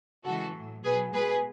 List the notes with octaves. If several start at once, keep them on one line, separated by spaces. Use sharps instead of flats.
C#3 E3 G#3 F#4 A4
A2 F#3
B2 G#4 B4
F#3
B2 G#3 G#4 B4